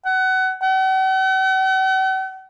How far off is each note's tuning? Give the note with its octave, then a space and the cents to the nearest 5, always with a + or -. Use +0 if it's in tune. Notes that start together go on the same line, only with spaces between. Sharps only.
F#5 +25
F#5 +45